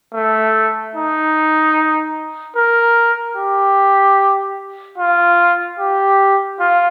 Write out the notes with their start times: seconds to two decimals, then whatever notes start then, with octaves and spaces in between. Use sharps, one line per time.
0.14 A3
0.95 D#4
2.57 A#4
3.37 G4
4.98 F4
5.79 G4
6.60 F4